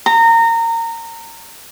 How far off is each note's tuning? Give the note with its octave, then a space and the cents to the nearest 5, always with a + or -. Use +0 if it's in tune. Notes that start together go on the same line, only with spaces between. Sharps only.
A#5 -25